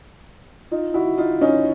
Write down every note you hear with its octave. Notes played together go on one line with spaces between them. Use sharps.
D#4 F4
E4 F#4
D#4 F4
C#4 D#4